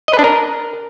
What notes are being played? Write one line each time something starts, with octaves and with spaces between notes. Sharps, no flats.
D#5
B4
D4
A#4